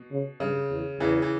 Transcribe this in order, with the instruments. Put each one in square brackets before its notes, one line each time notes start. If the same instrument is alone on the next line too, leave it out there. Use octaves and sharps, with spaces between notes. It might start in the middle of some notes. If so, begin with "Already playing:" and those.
Already playing: [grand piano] B2
[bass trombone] C#3
[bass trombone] G2 [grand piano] C#3
[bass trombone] E2
[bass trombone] E2 [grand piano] C#3 E3
[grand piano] E3